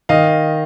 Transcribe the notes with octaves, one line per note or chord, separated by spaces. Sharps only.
D#3 D#5 F5